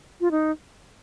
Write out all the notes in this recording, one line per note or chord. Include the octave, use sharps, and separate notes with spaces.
F4
D#4